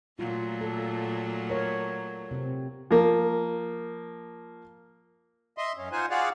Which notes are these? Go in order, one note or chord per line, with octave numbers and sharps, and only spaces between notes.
A#2 F#3 A3 F4
A4
A#4 C#5
C3 C4
F3 A#3
D#5 E5 C6
F#2 C#4
D#4 F4 C5 F#5 G#5
F4 F#4 G#4 D5 F5 F#5